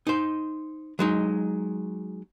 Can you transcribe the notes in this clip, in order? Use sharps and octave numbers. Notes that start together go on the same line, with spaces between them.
D#4 C5
F#3 G#3 D#4